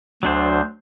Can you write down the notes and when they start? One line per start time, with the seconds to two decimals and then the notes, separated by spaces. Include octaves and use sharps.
0.23 D2 F#3 D4 C5